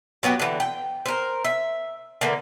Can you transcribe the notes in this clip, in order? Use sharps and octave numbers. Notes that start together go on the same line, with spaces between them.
F#3 B3 F#4 G4
D3 E3
G5
A#4 C5
E5
D3 E3 A#3